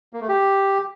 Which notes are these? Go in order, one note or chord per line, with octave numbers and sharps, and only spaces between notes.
A#3
A3
G4